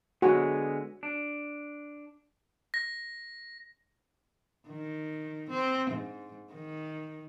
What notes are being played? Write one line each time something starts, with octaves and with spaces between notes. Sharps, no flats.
D3 G#3 B3 F#4
D4
A#6
D#3
C4
G#2
D#3